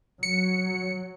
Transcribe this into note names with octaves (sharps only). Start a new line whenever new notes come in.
F#3 C#7